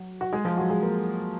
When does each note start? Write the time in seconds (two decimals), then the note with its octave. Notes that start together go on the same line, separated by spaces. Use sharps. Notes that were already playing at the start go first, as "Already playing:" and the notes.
Already playing: F#3 F#4
0.21 F#4
0.33 G#3 G#4
0.45 F3 F4
0.57 F#3 F#4
0.70 G#3 G#4
0.82 A#3 A#4